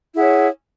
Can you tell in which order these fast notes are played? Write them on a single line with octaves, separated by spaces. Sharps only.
E4 G#4 F#5 C#5